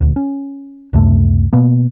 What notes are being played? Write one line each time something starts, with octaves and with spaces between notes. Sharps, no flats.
D#1 D2
C#4
C#2 F#2 C3 A3
B2 A#3 B3